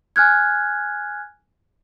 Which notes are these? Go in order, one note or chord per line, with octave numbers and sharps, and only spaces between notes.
G#5 F6 F#6 G#6